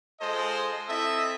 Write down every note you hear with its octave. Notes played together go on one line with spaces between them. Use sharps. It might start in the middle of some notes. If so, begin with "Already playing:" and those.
G#3 F4 A4 C5 D#5
C4 E4 A4 D#5 E5